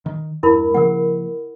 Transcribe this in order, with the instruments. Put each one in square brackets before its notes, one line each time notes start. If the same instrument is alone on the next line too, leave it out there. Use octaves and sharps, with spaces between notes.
[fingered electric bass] D#3
[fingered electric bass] E2 G2 [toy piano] E4 A#4 B5
[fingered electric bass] C#3 F3 A#3 [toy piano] A#4 F#5